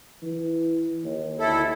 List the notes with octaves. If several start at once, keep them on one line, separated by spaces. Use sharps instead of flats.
E3
D#2
D2 E4 A4